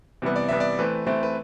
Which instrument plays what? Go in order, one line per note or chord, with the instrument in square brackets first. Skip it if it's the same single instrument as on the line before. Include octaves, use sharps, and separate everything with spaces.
[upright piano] C3 E3 G3 B3
[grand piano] D5
[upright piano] C3 E3 G3 B3 [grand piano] E5
[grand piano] D5
[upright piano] E3 A3 C4 [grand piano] B4
[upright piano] E3 A3 C4
[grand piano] B4